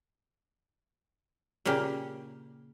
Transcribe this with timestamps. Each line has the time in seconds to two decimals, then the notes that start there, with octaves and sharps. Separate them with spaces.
1.65 A#2 C#3 A#3 G4